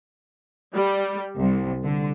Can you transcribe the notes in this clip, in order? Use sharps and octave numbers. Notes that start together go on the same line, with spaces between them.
G3
C2
D3